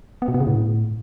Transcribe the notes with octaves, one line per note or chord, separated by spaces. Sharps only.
B3
B2
B3
C#3
A2